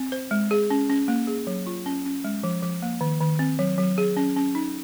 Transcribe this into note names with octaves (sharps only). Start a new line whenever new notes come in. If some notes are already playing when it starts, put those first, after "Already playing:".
Already playing: C4
C5
G#3
G#4
C#4
C#4
A#3
G#4
F#3
F4
C#4
C#4
G#3
F3
F3
A#3
D#3
D#3
C4
F#3
F#3
G#4
C#4
C#4
D#4